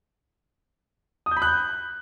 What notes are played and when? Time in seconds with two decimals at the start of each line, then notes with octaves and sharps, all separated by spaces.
1.26 D#6
1.31 G6
1.37 B5
1.42 F#6
1.47 G6